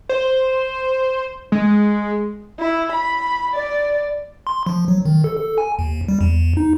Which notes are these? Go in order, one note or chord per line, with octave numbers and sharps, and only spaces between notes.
C5
G#3
E4
B5
D5
C6
F3
F#3
D#3
A4
A4
G#5
D#2
G3
E2
D#4